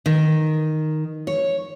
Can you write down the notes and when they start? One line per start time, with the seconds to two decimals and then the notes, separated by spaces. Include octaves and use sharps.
0.06 D#3
1.27 C#5